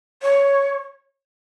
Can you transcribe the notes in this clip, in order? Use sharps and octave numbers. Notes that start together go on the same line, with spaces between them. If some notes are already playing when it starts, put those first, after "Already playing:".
C#5